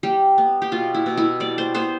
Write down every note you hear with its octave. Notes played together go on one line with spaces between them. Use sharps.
G3 G4
B3
G4
B2 F4
E4
B2
E4
G3 D5
C5
B3 C5